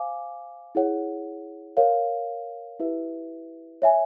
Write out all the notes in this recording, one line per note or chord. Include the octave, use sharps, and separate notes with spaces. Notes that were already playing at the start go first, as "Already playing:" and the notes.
Already playing: C5 F5 G#5 D6
E4 G#4 C#5 F#5
A#4 C#5 F5
E4 G4 B4 E5
C#5 E5 G#5